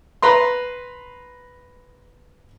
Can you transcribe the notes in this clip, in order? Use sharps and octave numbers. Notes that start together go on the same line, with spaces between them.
B4 A#5 C6